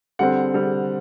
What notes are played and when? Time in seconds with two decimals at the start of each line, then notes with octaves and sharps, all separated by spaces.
0.19 D3 G3 C4 F#5
0.53 D3 G3 C4